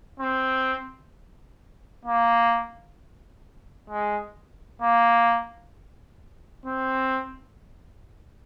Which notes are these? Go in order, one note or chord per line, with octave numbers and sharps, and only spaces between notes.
C4
A#3
G#3
A#3
C4